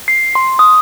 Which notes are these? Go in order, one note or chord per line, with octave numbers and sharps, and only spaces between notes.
C7
C6
D#6